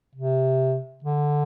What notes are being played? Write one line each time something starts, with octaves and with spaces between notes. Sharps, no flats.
C3
D3